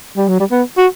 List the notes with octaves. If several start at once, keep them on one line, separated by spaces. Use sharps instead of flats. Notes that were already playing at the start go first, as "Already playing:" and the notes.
G3
F#3
G3
B3
F#4